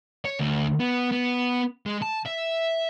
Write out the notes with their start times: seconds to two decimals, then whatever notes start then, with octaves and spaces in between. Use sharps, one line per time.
0.25 C#5
0.39 D2
0.80 B3
1.12 B3
1.86 G#3
2.02 A5
2.26 E5